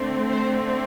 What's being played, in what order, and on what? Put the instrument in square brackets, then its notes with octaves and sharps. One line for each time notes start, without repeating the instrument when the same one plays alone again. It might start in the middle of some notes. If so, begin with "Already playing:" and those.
Already playing: [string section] D3 A3 C4
C5